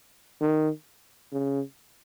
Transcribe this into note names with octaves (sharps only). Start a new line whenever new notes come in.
D#3
C#3